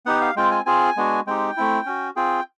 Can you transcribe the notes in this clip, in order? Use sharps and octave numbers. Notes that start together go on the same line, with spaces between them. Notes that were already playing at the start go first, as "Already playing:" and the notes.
B3 D#4 G4 F#5
F5
G#3 C4 F4 G5
G#5
C4 F4 G#4 G#5
G#3 B3 D4 F#4
G#3 C4 D#4 G4 G5
A3 C4 E4
C#4 F#4
C4 F4 G#4 G5